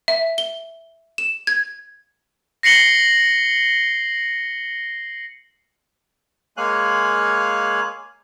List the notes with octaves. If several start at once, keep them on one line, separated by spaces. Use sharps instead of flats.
E5
G7
E7
G#6
A#6 C7 C#7 F#7 G7
G#3 A#3 C#5 F5 G#5 F#6